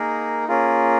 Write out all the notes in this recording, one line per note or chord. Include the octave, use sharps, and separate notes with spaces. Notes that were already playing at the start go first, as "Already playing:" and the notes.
Already playing: A#3 D#4 G#4 A#4
A#3 C#4 F4 G#4 A#4